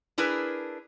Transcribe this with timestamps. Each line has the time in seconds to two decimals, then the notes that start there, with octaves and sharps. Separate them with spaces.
0.18 D4 E4 G#4 A#4 B4